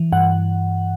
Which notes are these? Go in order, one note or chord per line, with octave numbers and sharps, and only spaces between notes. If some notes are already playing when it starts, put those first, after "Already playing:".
Already playing: E3
G2 F#5